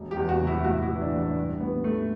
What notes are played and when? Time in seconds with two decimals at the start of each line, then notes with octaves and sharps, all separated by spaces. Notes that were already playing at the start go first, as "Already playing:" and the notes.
Already playing: E1
0.11 G4
0.17 E2
0.29 F#4
0.42 C3
0.47 E4
0.64 A1 F#4
0.82 E4
0.88 E3
1.01 D4
1.13 A1
1.19 D4
1.37 G2
1.60 A1 B3
1.84 A1 A3